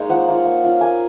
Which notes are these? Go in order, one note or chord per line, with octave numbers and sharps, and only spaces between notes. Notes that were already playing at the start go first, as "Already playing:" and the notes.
Already playing: G#3 A#3 D#4 C#5
F3 F#5
A#3 F4
A#3
C#4 F4
A#3 G#5